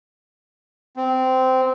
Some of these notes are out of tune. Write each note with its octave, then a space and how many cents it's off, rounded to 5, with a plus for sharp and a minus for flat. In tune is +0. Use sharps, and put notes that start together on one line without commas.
C4 -15